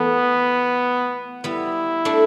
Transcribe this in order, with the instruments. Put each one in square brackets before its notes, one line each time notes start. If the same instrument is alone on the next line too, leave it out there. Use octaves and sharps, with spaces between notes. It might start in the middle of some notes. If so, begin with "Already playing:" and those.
Already playing: [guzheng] E3 A3 [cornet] B3
[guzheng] G3 B3 [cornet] E4
[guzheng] A3 D4